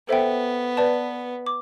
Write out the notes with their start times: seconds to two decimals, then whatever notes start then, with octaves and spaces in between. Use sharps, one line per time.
0.08 B3 A4 C5 E5 G5
0.77 B4 D5 A5
1.46 D6